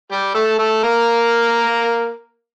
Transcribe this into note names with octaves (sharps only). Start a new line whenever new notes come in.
G3 G4
A3 A4
A3 A4
A#3 A#4